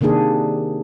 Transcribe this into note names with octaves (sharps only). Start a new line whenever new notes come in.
C3 D#3 A#3 D4 G#4